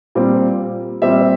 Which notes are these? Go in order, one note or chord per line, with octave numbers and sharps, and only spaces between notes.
A#2 G3 C4
A#2 G3 C4 E5